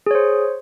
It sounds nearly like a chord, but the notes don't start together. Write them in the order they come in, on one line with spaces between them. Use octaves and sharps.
G#4 C#5 C5